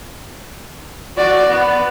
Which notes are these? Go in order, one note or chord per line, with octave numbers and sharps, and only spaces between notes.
F#4 D5
B3